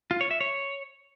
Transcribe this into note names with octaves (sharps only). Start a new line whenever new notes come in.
F4
C#5
E5
C#5